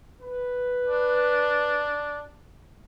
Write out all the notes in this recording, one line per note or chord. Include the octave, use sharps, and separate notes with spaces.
B4
D4